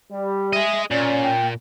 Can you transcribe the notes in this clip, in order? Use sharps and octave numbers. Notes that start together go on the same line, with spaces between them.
G3
G#4 D#5 E5
A#2 C#4 D5
G5